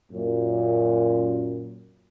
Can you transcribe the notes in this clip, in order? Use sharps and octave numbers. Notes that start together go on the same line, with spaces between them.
F#2 A#2